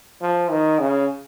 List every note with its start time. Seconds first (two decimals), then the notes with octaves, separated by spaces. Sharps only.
0.21 F3
0.51 D#3
0.79 C#3